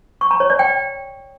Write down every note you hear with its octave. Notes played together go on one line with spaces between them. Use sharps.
C#6
A#5
C#5
D5
G5